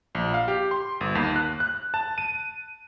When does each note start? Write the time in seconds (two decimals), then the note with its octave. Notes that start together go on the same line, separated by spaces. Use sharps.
0.15 A#1
0.34 F5
0.48 G4
0.71 C6
1.01 G1
1.15 D#2
1.36 F#6
1.60 F#6
1.94 A5
2.18 D#7